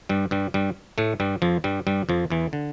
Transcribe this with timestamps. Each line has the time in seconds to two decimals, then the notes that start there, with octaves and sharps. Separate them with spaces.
0.09 G2 G3
0.31 G2 G3
0.54 G2 G3
0.98 A2 A3
1.20 G2 G3
1.42 F2 F3
1.64 G2 G3
1.87 G2 G3
2.09 F2 F3
2.30 E2 E3
2.53 D3